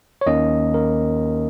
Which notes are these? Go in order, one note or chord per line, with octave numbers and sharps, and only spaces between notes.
C#5
D#2 D#3 A#3 C#4 D#5
A#4